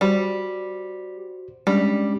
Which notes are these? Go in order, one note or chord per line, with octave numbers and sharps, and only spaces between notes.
G3 F#4 C5
G3 G#3 C#4 D4